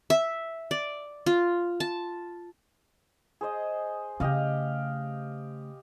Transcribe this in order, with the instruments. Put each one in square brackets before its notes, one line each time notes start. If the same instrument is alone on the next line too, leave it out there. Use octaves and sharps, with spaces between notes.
[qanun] E5
D5
F4
A5
[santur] G#4 C5 D#5
[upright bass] C#3 A3 [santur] G4 D#5 F5